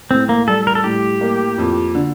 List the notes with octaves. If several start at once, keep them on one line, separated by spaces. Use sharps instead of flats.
A2 C4
A#3
G3 A4
A#4
A4
A2 G4
A#3
F2
D3